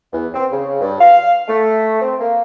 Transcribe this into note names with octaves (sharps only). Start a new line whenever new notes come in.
E2
C4
C#3
G2
F5
A3
C4
A#3